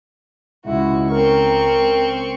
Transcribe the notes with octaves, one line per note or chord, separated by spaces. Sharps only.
C#2 G#3 D#4 E4 F#4
C4 A#4 C#6